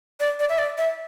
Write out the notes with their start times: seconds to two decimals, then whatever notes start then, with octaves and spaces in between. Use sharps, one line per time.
0.20 D5
0.39 D5
0.49 E5
0.58 D5
0.78 E5